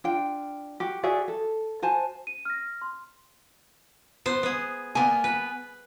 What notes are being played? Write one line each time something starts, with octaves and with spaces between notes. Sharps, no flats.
D4 F4 G5
F#4 G4
F#4 G#4 D5 E5
A4
F#4 C5 G#5 A5
D#7
F6 A#6
C6
B3 C5
B3 G#4
A#3 B3 G#5
B4